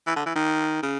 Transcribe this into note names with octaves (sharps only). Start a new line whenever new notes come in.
E3
D3
E3
D#3
C#3